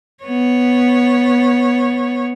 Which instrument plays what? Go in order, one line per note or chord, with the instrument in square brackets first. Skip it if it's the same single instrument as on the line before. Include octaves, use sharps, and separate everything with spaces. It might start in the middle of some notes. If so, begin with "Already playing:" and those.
[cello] B3 C#5